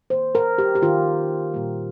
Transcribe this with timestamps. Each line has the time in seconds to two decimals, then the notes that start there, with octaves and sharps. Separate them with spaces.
0.10 D#3 A#3 C5
0.35 A#4
0.58 G4
0.75 G4
0.82 D#3 A#3 F4
1.54 A#2 G3 A#3